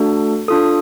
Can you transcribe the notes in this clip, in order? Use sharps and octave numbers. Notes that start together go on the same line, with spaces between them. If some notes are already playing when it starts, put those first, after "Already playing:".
Already playing: A3 D4 F#4 A4
D4 F4 A4 D#6